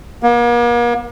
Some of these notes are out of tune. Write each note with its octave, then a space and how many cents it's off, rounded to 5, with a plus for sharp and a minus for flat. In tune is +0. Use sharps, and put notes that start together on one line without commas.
A#3 +40